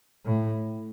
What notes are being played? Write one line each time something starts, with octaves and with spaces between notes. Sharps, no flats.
A2